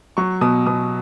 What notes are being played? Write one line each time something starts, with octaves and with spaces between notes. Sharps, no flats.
F#3 C#6
B2 D#6
B2 D#6